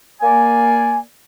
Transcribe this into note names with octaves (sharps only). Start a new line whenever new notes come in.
A#3 D5 G#5